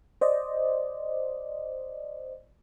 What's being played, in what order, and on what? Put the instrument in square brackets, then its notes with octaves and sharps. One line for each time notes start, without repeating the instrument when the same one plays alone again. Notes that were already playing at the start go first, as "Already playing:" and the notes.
[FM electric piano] C5 D5 D#5